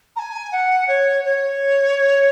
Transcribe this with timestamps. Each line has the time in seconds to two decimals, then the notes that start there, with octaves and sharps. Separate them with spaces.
0.16 A#5
0.19 G#5
0.52 F#5
0.88 C#5
1.24 C#5